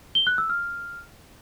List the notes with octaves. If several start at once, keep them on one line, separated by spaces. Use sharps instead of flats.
G7
F#6
E6
F6